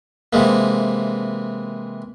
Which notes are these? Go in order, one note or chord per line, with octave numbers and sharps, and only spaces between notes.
C3 E3 G#3 A#3